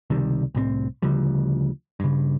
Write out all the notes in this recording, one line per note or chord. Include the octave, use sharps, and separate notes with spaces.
C#2 C3 D#3 G3
C2 A2 G#3 C4
D2 C#3 F3 G3
G2 C#3